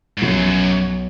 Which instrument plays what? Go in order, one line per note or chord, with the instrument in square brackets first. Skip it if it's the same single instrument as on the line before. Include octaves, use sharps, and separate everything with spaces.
[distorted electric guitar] G#2
[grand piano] B1 [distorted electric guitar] F#2